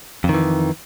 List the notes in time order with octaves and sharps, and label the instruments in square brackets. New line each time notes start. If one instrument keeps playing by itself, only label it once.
[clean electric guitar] F2
D#3
E3